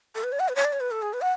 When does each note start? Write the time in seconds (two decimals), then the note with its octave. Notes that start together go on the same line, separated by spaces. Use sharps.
0.15 A4
0.24 B4
0.32 C#5
0.40 F#5
0.49 B4
0.56 C#5
0.65 D5
0.73 C#5
0.80 B4
0.91 A4
1.02 G#4
1.13 B4
1.21 F#5